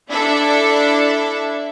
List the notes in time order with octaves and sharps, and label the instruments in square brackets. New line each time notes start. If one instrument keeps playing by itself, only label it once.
[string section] D4 E4 A4 D5 E5